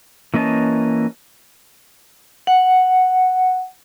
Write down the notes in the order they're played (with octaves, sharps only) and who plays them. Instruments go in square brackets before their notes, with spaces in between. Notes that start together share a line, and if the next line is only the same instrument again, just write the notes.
[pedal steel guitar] E3 A#3 C#4 D#5 A5
[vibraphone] F#5